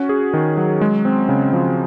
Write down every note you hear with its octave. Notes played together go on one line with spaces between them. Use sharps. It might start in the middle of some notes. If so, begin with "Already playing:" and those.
Already playing: C#4 F#4
G#4
D#3
F#3
G#3
C4
C#3
F3